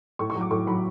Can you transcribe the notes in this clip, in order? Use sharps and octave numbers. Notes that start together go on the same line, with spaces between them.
A2 C#6
C#6
F#3
D6
A2 C#6
F#3 B5